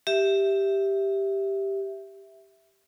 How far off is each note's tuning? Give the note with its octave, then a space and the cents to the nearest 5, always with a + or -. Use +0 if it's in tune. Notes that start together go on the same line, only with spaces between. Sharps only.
G4 +0 E5 +0